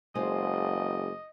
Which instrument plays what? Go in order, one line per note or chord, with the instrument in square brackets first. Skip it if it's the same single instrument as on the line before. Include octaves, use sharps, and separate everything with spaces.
[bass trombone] F#1 [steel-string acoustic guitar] G#3 C5 [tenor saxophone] D#5